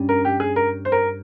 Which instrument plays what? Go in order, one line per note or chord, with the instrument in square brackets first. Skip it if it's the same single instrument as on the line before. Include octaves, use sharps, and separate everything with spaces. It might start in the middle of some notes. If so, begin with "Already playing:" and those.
Already playing: [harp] G2 G3 C#4
[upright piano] A#4
G4
G#4
A#4
C5
A#4